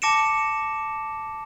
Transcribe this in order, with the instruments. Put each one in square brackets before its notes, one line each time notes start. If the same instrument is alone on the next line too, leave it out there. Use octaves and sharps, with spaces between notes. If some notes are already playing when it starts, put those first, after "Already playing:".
[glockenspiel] A5 D6 A#6 C#7 D7 E7